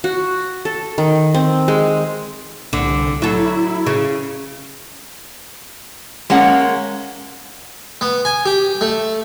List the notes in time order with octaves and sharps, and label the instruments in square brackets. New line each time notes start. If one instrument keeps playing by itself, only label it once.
[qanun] F#4
A4
D#3
C4
G#3
[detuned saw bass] C2 [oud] D3
[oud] F#3 A4 [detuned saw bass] E4
[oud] C#3
[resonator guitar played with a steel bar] G#3 A#3 C#4 F#5
[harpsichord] B3
G#5
G4
A3